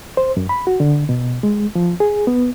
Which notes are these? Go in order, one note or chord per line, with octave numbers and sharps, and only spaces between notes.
C5
F#2
B5
F#4
D3
B2
G#3
F3
G#4
B3